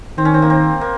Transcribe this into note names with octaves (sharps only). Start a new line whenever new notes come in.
D#3 C4
C#4
C4
A#3
C4
A#3